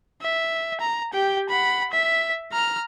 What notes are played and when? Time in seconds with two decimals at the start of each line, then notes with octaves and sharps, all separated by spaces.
0.22 E5
0.80 A#5
1.13 G4 G5
1.49 F#5 B5
1.90 E5 B6
2.52 A#5 F6